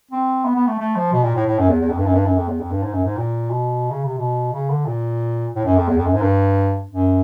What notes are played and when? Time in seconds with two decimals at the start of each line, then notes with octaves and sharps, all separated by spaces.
0.11 C4
0.45 B3
0.55 B3
0.67 A3
0.79 A3
0.96 F3
1.13 B2
1.24 A#2
1.36 A2
1.46 A2
1.59 F#2
1.69 E2
1.81 E2
1.90 F2
1.98 G2
2.06 F#2
2.15 G2
2.26 F#2
2.37 F2
2.48 E2
2.60 F2
2.71 G2
2.83 G#2
2.93 F#2
3.05 G#2
3.17 A#2
3.50 B2
3.90 C#3
4.05 C3
4.18 B2
4.52 C#3
4.70 D3
4.86 A#2
5.55 A2
5.65 F#2
5.77 F2
5.88 E2
5.98 F2
6.06 F#2
6.14 G#2
6.22 G2
6.91 F#2